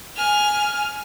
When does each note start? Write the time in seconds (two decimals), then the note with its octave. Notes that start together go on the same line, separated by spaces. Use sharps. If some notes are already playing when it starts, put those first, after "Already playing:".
0.17 G#5 F6